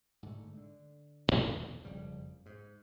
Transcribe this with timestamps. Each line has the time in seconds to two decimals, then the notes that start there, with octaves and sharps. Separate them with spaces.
0.23 G#2 D3 A3
0.57 D3
1.27 D1 G#1
1.42 D#1 E2 B2 D3
1.85 F#1 F2 C#3 G3
2.46 G#2